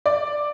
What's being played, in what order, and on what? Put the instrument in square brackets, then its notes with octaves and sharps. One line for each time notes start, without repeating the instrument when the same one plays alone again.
[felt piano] D5